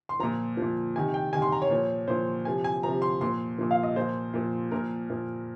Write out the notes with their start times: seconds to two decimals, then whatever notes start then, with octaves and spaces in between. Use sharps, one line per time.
0.09 C6
0.19 A#2 F3 A#5
0.57 A#2 F3
0.96 C3 D#3 G#5
1.14 G5
1.33 C3 D#3 G#5
1.42 C6
1.52 A#5
1.62 C#5
1.70 A#2 F3
2.08 A#2 F3 C5
2.45 C3 F3 G#5
2.64 G#5
2.83 C3 F3 A#5
3.02 C6
3.21 A#2 F3 C6
3.58 A#2 F3
3.71 F5
3.83 D#5
3.96 A#2 F3 C5
4.34 A#2 F3
4.71 A#2 F3 A#4
5.10 A#2 F3